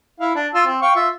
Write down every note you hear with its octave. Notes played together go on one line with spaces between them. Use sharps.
E4 F5
D4
F4 E6
C4
F5 G5 C#6
F4 E5